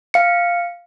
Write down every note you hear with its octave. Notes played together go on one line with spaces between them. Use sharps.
F5 C#7